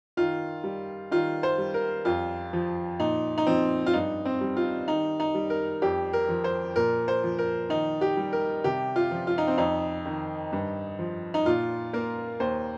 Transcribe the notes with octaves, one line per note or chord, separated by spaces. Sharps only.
D#3 F4
G3
D#3 F4
C5
G3
A#4
F2 F4
F3
A#2 D#4
D#4
F3 C4
F4
G2 D#4
C4
G3
F4
D#3 D#4
D#4
G3
A#4
F2 G4
A#4
F3
C5
A#2 A#4
C5
F3
A#4
D#3 D#4
G4
G3
A#4
C3 G4
F4
F3
F4
D#4
C4
F2 D#4
D#3
G2
F3
D#4
A#2 F4
A#3 A#4
D#2 C5